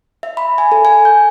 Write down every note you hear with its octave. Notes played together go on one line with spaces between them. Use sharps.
E5
B5
G#5
A4
G#5
G6